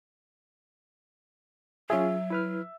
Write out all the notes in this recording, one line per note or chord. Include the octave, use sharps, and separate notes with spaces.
F#3 C#4 F4 G#4 E5
E4 B4 F6